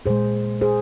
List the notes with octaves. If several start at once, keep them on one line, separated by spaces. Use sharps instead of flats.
A#2 G#3 G#4 C5
G#4 C5